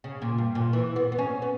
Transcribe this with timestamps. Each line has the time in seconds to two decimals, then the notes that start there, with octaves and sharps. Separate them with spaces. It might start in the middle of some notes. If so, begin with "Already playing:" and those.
0.04 C#3
0.22 A#2
0.38 G2
0.55 A#2
0.73 E3
0.96 B3
1.12 B3
1.19 C#4
1.42 B3